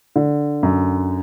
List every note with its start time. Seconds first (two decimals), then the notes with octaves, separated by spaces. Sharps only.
0.16 D3
0.63 F#2